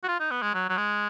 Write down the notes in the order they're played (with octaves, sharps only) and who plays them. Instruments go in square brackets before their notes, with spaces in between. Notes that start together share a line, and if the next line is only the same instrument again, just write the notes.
[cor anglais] F#4
F4
D#4
B3
G#3
F#3
F#3
G#3